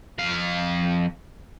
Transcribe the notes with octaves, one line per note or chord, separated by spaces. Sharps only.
F2 F5